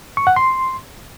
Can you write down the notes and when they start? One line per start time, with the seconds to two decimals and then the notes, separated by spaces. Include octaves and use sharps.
0.17 C#6
0.27 F#5
0.36 C6